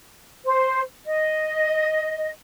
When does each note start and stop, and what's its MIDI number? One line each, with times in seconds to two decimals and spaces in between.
0.44 0.81 72
1.05 2.29 75